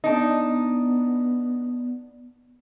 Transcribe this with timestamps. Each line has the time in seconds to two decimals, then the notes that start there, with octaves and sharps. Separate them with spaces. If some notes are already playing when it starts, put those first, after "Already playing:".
0.04 B3 D4 D#4